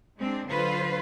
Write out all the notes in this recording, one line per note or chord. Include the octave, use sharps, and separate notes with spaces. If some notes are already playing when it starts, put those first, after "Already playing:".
G#3 C4 D4
D3 F#3 F4 B4 C5